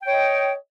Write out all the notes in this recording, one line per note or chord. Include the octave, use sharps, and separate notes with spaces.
C#5 D#5 G5